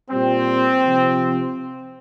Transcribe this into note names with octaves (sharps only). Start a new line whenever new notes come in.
A#2 G3 C4
C3 F3